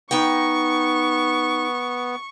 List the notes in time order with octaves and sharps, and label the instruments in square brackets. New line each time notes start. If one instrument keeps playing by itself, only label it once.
[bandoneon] B3 [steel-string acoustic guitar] D#4 G5 [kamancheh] C#6